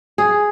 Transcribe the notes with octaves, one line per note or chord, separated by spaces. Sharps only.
G#4